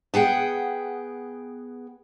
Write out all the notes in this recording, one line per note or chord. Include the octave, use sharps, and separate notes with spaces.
B3 G#4 F#5 G5